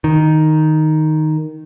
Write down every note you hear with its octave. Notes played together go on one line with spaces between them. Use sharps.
D#3